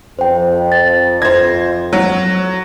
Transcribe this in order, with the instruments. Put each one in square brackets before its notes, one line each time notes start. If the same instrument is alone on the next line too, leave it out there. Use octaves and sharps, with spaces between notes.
[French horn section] F2 [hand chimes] C5 G5
[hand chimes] A6
[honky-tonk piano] C5 G#6 [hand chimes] A#6
[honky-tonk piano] F#3